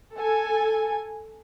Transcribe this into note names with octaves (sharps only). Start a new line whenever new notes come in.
A4 G#5